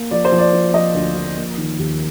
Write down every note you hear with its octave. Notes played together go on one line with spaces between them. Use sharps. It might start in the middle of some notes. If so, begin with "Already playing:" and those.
Already playing: A#3
F3 D5
C5
F3
D5
F3
F3 D#5
D2
F3
A#3
D#3
D#2